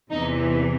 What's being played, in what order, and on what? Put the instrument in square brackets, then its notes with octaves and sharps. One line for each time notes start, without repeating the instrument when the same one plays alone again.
[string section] E2 C3 E3 D#4